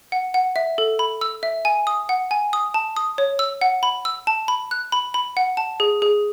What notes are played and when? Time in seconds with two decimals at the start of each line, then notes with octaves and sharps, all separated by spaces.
0.12 F#5
0.34 F#5
0.56 E5
0.78 A4
0.99 B5
1.21 E6
1.43 E5
1.65 G#5
1.87 D#6
2.09 F#5
2.31 G#5
2.53 D#6
2.74 A5
2.96 D#6
3.18 C#5
3.39 E6
3.61 F#5
3.83 B5
4.05 E6
4.27 A5
4.48 B5
4.71 F#6
4.92 B5
5.14 B5
5.37 F#5
5.57 A5
5.80 G#4
6.02 G#4